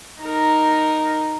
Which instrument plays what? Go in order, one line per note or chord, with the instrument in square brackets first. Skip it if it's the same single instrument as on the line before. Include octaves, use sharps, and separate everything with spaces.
[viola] D#4 A#4